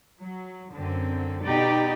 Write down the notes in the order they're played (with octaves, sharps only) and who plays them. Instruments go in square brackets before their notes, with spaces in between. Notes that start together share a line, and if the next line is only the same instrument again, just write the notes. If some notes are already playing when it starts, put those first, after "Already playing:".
[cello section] F#3
F#2 D3 C4
B2 D#4 G4 D5